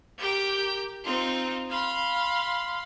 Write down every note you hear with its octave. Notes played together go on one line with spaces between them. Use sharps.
G4 A#4 G5
C4 D#4 F4
F5 B5 C6